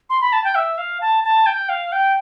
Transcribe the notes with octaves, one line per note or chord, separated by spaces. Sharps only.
C6
B5
A5
G5
E5
F5
A5
A5
G5
F5
G5